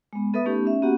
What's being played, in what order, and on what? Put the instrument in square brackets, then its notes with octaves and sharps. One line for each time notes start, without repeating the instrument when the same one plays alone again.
[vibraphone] G#3 B3
B3 A4 B4 E5 D#6
A3 B3 C#4 D#4 G4
C#4 E5
A#3 B3 C#4 F#4 G4 F#5